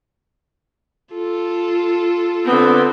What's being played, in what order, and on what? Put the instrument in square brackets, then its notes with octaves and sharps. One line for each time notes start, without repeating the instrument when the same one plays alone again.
[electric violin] F4 A4
[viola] D3 C4 [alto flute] B3